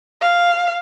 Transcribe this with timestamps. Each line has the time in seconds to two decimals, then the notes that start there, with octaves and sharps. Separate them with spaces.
0.21 F5